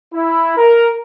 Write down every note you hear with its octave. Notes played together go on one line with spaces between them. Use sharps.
E4
A#4